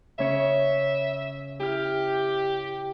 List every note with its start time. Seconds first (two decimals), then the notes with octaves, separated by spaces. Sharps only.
0.18 C#3 C#4 C#5 E5
1.60 E4 G4 F6